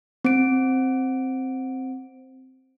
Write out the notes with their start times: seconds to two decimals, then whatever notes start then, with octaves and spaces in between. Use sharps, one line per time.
0.25 C4 D7